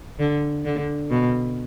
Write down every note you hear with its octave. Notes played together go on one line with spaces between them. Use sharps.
D3
D3
B2